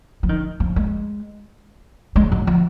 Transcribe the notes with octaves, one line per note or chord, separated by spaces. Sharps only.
F3
D#3
F3
G#3
G#3
F#3
F3